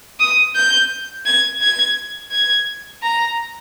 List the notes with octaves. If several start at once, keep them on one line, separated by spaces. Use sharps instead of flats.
D#6
G6
G#6
G#6
G#6
A#5